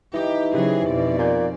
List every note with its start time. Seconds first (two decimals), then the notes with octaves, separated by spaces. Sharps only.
0.14 E3 D#4 G4 A#5
0.53 C#3 F#3 G4 G#4 B4 C5
0.87 F2 B2 D5
1.19 A#2 G#5 C6 G6